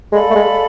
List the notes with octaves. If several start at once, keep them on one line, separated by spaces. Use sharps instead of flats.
G#3 A4 D5 F5 B5
A3
G#3